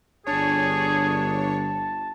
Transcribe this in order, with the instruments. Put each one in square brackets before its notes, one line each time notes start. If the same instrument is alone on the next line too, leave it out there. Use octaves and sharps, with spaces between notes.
[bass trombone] G1 [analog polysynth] D4 C#5 [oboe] G#4 [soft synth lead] A5